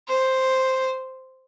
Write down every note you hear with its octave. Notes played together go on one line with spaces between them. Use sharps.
C5